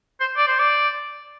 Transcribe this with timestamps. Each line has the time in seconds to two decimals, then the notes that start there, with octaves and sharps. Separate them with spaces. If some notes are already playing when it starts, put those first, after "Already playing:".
0.20 C5
0.37 D5
0.48 C5
0.59 D5